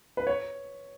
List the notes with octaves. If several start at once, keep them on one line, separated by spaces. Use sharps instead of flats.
B4
C#5